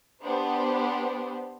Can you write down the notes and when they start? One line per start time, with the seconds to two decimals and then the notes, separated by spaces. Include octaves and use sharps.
0.22 B3 D4 G4 C5